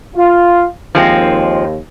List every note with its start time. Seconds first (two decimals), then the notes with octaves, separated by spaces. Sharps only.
0.15 F4
0.95 D#2 F3 G#3 C4